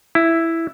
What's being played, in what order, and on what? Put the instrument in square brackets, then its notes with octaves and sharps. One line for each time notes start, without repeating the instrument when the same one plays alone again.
[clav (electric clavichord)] E4